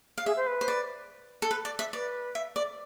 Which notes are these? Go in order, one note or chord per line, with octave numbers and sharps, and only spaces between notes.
F5
G#4 E5
C5
B4
C5
D5
A4
B4
D5
E5
B4 D5
E5
D5